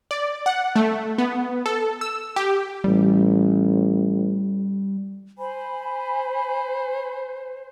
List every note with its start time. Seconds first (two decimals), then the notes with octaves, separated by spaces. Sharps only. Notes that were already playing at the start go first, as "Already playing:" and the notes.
0.11 D5
0.46 F#5
0.76 A3
1.18 B3
1.66 A4
2.01 E6
2.36 G4
2.84 A1 G3
5.38 C5 G#5 B5